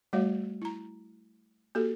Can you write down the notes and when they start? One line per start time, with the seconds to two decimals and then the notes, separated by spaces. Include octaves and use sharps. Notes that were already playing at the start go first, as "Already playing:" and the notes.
0.13 G3 A3 F#4 C#5 F5
0.62 E4 A#5
1.75 A#3 F#4 G4 A4